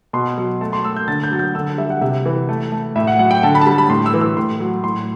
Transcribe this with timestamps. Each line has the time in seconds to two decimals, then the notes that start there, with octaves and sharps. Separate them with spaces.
0.13 B2 C6
0.38 F#3
0.61 A3 A5
0.73 C6
0.84 A3 E6
0.97 G6
1.08 D3 A6
1.23 G6
1.32 F#3 A6
1.39 G6
1.55 D3 E6
1.78 G3 E5
1.90 F#5
2.01 C3 E5
2.26 E3
2.49 A3
2.72 A3
2.96 A2 E5
3.07 F#5
3.19 F#3 F#5
3.31 G5
3.43 D3 A5
3.55 B5
3.61 A5
3.66 G3 B5
3.78 B5
3.89 A2 C6
4.06 E6
4.13 E3
4.21 E6
4.37 A2 C6
4.60 F#3
4.84 A2 C6